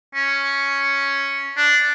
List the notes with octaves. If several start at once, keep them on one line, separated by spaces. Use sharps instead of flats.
C#4
D4